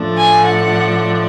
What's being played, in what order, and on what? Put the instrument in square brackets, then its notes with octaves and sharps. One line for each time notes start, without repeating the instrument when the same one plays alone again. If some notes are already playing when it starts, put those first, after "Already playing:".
Already playing: [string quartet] A2 F3 A3 D4
G#5
F#5